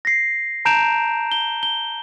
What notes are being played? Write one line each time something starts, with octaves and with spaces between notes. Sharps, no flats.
A#6 C7
A5 A#5 G6 D7 E7 F7
G7
G7